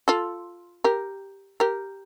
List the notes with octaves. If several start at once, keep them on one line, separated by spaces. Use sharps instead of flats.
F4 A4
G4 A#4
G4 A#4